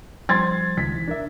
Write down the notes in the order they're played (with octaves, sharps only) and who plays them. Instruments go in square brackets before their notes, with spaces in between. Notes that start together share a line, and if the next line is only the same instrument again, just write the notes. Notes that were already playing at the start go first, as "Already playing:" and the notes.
[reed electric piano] F3 G3 C5 [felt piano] C6 G#6 A6
[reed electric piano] C#2 D#3 [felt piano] B6
[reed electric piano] C2 E3
D4 A#4 E5